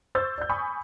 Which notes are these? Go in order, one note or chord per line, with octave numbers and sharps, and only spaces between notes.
C5 C#6 E6 G6 A6
D5 G6
G#5 B5 C#6 D#6